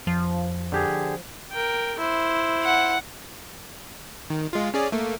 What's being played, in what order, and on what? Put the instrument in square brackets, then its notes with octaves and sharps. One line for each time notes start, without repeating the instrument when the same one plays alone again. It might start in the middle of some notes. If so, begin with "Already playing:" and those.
[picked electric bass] F2 [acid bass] F3
[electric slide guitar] D3 G4 G#4
[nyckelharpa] A#4 G5
E4 C5
[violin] F#5
[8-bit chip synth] D#3
G#3 F4
C#4 G#4 D5
A3 A#3